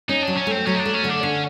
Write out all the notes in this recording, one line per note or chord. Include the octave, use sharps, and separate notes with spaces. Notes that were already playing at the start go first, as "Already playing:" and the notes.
C#4 D#4
F#3 D4
C#4
A3
C4
F#3 C#4
D#4
D4
A3
C#4
D3
D4
D3 C#4